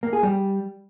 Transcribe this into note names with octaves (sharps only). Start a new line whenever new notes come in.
A#3
G#4
G3